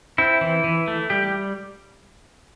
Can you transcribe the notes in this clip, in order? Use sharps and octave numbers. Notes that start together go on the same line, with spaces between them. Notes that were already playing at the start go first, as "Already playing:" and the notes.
C4 E4
E3
E3
A3
G3 G4